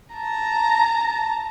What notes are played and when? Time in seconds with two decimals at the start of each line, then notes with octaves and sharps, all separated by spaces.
0.14 A5 A#5